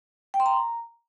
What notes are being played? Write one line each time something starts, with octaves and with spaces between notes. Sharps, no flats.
G5
C6
A#5